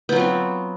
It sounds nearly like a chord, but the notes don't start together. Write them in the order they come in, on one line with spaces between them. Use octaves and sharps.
B3 F#3 F4 C4